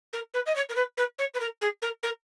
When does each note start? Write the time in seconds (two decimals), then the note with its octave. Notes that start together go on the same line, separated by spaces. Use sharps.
0.12 A#4
0.33 B4
0.45 D#5
0.55 C#5
0.69 A#4
0.75 B4
0.97 B4
1.18 C#5
1.34 B4
1.39 A#4
1.61 G#4
1.81 A#4
2.02 A#4